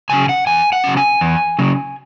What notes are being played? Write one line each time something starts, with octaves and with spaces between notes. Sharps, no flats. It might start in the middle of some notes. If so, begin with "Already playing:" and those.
C#3 F#3 C#4 G#5
F#5
E2 G#5
F#5
C#3 F#3 C#4
G#5
E2
C#3 F#3 C#4